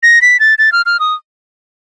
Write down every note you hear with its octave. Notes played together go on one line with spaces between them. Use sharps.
A#6
B6
A6
A6
F6
F6
D#6